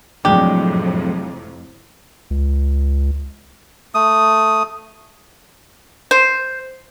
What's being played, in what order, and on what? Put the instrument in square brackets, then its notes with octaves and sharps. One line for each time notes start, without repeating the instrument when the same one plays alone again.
[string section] F2 A2 C3 [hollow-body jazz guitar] F#3 G#3 D4 [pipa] G4
[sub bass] C#2
[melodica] A3 D#6
[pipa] C5